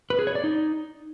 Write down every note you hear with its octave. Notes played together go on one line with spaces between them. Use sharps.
B4
G#4
C#5
D5
D#4